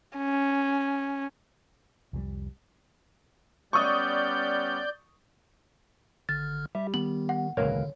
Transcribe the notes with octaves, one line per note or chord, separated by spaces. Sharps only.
C#4
C2 F2 F#3 G3
G3 B3 C#4 D5 C#6 D#6 G6
G#1 D3 F6 A6
G3 G4 E5
D#3 B3 F#7
F#5
E1 C#2 A#2 D3 A#4 B4 C#5 F5